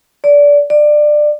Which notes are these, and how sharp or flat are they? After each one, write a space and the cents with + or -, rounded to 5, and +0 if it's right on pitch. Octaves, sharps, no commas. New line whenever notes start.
D5 -20
D5 +20